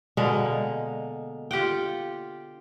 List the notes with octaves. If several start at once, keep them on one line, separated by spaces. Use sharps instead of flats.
B2 D3 G#3 A#3
F4 G4 F#5 G5